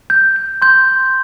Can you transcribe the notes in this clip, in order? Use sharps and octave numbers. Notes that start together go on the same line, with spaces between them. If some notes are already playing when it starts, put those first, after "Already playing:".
G6
G6
C6 G6